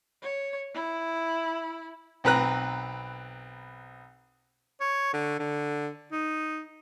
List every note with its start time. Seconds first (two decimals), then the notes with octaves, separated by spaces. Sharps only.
0.22 C#5
0.74 E4
2.24 B1 C4 B4 A#5 F#6
4.81 C#5
5.13 D3
5.39 D3
6.12 D#4